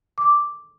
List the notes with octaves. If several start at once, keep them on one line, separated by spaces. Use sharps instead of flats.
D6